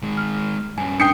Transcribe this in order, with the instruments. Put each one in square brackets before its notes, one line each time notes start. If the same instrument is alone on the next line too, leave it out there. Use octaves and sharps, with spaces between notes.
[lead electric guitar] D#3 G#3
[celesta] F6
[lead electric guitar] G2 C#4 [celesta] G#5
[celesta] D4 D#6 G6 [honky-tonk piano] G5 C7 C#7